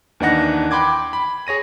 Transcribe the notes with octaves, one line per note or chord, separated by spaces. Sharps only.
D#2 E3 D4 D#4 F#5 A#6
G5 B5 C6 D6 G#6
B5
G#4 C#5 A#6 D#7